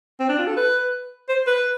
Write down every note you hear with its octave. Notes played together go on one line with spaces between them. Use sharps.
C4
D4
F4
A4
B4
C5
B4